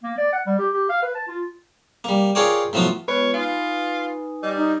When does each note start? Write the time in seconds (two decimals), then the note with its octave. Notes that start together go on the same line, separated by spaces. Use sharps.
0.04 A#3
0.18 D5
0.33 F#5
0.46 G3
0.59 G4
0.73 G4
0.89 F5
1.02 B4
1.15 A5
1.28 F4
2.04 G3 A#3
2.35 F4 G#4 A#4 C#5 D5 G5
2.73 A2 F3 F#3 B3 F4
3.08 G#3 B3 F4 B4 C#5
3.33 D#4 F4 G#5 D#6
4.43 G3 D#5
4.56 D#4